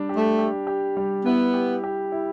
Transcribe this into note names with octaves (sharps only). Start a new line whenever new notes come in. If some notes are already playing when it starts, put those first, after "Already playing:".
Already playing: G3 D4
G4
A3
G4
G4
G3
B3 E4
G4
G4
E4